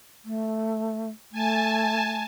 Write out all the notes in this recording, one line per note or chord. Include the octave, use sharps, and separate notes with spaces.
A3
A3 G#5 A5